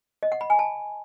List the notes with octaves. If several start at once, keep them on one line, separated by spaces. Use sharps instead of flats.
D#5
F#5
B5
G#5
A5